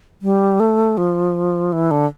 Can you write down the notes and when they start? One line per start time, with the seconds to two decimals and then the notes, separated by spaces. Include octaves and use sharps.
0.22 G3
0.60 A3
0.97 F3
1.73 E3
1.91 D3